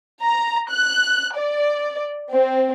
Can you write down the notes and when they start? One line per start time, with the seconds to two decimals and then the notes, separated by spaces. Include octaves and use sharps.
0.23 A#5
0.69 F#6
1.38 D5
2.31 C4